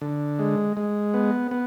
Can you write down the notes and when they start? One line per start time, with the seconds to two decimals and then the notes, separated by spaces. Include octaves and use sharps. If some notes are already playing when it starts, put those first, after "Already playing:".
0.01 D3
0.39 G#3
0.77 G#3
1.14 B3
1.51 B3